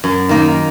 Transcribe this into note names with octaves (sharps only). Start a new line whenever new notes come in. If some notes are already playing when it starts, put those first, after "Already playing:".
F#2
D#3 A#3